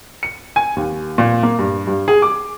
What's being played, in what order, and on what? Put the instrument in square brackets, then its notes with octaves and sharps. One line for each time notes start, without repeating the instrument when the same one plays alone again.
[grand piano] C#7
G#5
D#2
A#2
A#3
G2
G2
G#4
D6